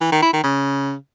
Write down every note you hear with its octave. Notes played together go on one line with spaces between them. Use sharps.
E3
D#3
E4
D#3
C#3